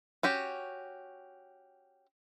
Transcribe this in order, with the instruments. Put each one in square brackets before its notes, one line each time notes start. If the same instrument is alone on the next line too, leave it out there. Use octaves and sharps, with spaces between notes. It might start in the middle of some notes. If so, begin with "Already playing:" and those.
[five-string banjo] C#4 F#4 G4